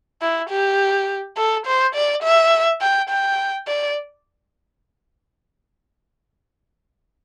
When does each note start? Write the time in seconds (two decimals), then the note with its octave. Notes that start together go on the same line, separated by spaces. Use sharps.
0.22 E4
0.50 G4
1.37 A4
1.66 C5
1.95 D5
2.23 E5
2.81 G5
3.10 G5
3.68 D5